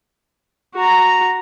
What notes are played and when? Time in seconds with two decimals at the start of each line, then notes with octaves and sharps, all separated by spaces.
0.75 F#4 A#5